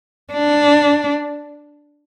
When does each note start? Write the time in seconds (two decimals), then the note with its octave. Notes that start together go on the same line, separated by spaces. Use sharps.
0.33 D4